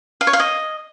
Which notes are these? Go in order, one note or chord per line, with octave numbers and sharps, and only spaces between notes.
F5
C#5
F5
D#5